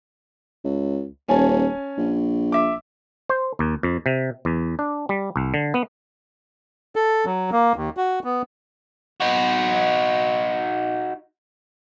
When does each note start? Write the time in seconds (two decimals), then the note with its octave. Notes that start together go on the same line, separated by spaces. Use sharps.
0.64 C#2
1.28 D#1 C#4 G#5 A5
1.98 A#1
2.52 E5 D6
3.29 C5
3.59 D#2
3.83 F2
4.06 C3
4.45 E2
4.79 D4
5.09 G3
5.36 C2
5.54 D3
5.74 B3
6.96 A4
7.25 F#3
7.52 A#3
7.76 D#2
7.97 F#4
8.24 B3
9.20 D#4 F#4